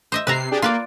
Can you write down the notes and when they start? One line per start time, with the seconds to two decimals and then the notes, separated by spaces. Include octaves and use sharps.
0.12 C5 D#5 E5
0.27 C3 B4 E5 A#5 C7
0.51 D4 G4 G#4
0.62 A#3 F4 B4 D5